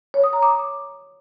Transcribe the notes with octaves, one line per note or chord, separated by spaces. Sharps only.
C#5
D#6
A#5
D6